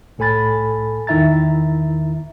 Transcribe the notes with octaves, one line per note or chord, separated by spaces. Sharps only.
C2 A2 A4 G#5 B5 A6
E2 D#3 E4 E5 A#5 A6